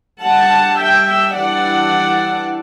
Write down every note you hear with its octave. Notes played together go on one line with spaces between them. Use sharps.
G3 D4 F#5 A5
E5 G5
E5 G5
E3 G3 D4 D5 F#5